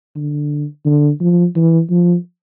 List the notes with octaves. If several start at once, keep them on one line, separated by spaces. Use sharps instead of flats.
D3
D3
F3
E3
F3